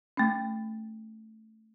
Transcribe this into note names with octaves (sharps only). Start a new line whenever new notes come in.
A3 C#4